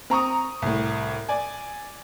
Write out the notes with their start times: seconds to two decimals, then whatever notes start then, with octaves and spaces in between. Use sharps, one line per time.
0.10 C4 A#5 C#6 D#6
0.62 C2 A2
1.29 D5 G#5